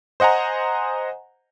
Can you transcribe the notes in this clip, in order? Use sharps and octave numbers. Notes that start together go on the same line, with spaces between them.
C5 D#5 F#5 G#5 A#5